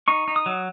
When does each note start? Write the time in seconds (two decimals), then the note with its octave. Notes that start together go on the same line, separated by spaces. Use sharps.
0.08 D#4 C#6
0.28 D#4
0.36 D#6
0.46 F#3